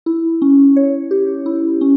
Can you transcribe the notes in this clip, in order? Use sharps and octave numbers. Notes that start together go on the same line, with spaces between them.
E4
C#4
C#5
G4
E4
C#4